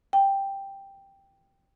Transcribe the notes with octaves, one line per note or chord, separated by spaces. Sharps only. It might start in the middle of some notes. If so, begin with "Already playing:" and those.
G5